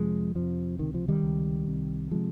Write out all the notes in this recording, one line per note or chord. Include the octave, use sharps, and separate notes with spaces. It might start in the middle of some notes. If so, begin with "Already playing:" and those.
Already playing: F2 C3 F3 G#3
F2 C3 F3
C#2 C3 D#3
F3
D#3 G3
C#2 C3
C2 C3
C3 F3 G#3